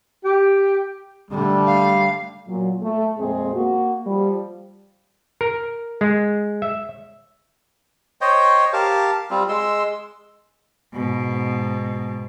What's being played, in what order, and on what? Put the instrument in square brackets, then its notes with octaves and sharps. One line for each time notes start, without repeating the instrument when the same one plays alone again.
[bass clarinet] G4
[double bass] D3 A3 [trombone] G3
[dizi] F5
[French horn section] A#2 F#3
A3
F2 A#2 G#3 C4 G#4
A#3 F#4
F3 G3
[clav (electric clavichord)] A#4
G#3
E5
[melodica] C5 C#5 D#5 G5
G4 A#4 F5 A5
G3 C4 F4
G#3 C6 E6
[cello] G#2 B2